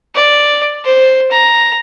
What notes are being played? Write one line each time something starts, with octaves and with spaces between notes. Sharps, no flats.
D5
C5
A#5